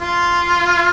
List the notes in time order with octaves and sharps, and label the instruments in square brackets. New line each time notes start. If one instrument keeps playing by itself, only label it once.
[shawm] F4